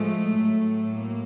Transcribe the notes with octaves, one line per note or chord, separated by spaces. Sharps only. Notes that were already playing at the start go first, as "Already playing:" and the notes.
Already playing: A2 F3 G#3 A3
A2 F#3
A#3